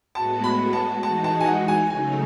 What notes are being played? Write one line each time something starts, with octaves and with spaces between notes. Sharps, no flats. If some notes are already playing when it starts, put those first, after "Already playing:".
A2 G#3 B3 F#4 A5
B5
A5
E3 G#3 D#4 F#4 A5
A5
G#5
F#5
G#5
C#3 F#3 A3 D#4 G#5